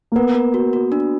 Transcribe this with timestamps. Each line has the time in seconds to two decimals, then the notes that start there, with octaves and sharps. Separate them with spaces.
0.12 A#3
0.16 B3 A#4
0.35 A#4
0.54 F#4
0.73 F#4
0.92 D4